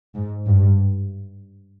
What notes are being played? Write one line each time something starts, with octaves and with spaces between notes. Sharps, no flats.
G#2
G2